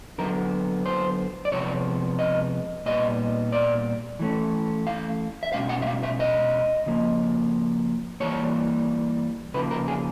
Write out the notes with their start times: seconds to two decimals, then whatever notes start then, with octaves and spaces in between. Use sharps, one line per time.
0.18 D3 F#3 B3 A#4
0.86 C5
1.45 D5
1.52 C3 F3 G#3 B3 C#5
2.19 D#5
2.86 A#2 G3 B3 D#5
3.52 D5
4.19 E3 A3 C#4
4.87 F5
5.43 E5
5.53 B2 G#3 C#4 F5
5.69 F#5
5.82 E5
5.87 F5
6.03 E5
6.20 D#5
6.86 C#3 F3 A#3
8.20 E3 G3 A#3 C#5
9.54 C#3 F3 A#3 B4
9.71 A#4
9.88 G#4